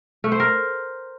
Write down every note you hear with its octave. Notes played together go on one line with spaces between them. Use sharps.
A3
C5
A#4